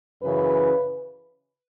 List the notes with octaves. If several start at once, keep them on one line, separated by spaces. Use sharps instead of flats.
F#2 C#3 E3 B4